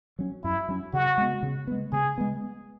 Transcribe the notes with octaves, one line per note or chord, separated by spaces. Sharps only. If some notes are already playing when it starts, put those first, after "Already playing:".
F#3 C#4
F#2 E4
F#3 C#4
C#3 F#4
G#3 B3
C#3
G#3 B3
C#3 G#4
G#3 B3